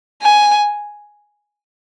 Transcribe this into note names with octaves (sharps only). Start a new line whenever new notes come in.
G#5